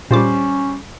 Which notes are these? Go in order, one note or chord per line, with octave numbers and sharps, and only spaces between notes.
A#2 G3 C#4 F4 C5 D6